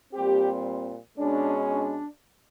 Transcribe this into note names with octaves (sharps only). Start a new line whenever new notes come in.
A#2 G3 C4 G4
B2 G#3 C#4 D4
D4